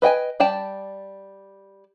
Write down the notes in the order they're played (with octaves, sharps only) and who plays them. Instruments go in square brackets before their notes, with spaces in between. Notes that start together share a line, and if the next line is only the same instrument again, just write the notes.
[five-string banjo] B4 D#5 G5 G#5
G3 D5 G5 A5